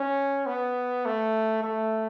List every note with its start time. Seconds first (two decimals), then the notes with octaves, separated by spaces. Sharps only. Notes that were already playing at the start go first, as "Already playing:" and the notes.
Already playing: C#4
0.47 B3
1.06 A3
1.63 A3